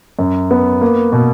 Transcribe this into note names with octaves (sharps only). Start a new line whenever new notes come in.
F#2
B3
A#3
B2